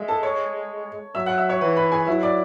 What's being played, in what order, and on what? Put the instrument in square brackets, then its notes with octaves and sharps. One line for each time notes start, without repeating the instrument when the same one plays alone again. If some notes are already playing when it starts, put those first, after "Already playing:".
Already playing: [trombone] G#3 [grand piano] E5
[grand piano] A4 A5
C#5 C#6
[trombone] F#3 [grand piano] E5 E6
[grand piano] F#5 F#6
E5 E6
C#5 C#6
[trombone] E3 [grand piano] B4 B5
[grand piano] B4 B5
G#4 G#5
[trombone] F#3 [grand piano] E4 E5
[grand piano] D5 D6